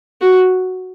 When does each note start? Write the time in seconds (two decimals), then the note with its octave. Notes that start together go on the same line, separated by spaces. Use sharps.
0.22 F#4